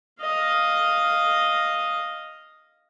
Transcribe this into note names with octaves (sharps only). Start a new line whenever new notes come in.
D#5 F5